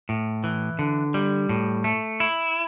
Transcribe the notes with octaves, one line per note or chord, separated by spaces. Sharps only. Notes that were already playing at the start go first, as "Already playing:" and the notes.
A2
E3
D3
G3
A2
A3
E4